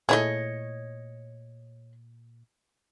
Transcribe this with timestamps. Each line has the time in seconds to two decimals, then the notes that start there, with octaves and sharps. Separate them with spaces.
0.09 A#2 A3 E4 G#4 C#5 D#5